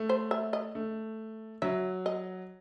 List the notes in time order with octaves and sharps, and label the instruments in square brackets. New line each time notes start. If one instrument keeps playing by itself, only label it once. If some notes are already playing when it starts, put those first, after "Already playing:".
Already playing: [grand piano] A3
[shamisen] C5
E5
D#5
[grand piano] A3
[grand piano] F#3 [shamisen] E5
[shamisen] D#5